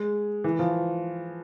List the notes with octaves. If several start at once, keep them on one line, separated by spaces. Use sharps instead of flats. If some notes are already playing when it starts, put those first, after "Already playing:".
Already playing: G#3
E3
F3